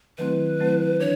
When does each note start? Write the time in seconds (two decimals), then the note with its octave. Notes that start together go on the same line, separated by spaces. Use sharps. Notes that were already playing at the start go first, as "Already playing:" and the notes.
0.18 D#3 F#3 A3 C4 E4 B4
0.59 D#3 F#3 A3 C4 E4
1.00 E3 D4 C#5